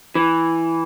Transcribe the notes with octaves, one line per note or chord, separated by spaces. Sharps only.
E3